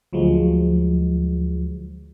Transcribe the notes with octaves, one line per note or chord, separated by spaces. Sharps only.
D2 F3 F#3 G#3